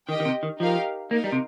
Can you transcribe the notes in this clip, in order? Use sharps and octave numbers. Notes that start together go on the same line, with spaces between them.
D#3 G4 D#5 G5
D#3
C3
D#3
F3 D#4 G4 A#4 F5
A#3 D#4 A#4 F5
G3
C3